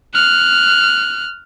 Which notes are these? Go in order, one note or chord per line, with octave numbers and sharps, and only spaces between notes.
F6 F#6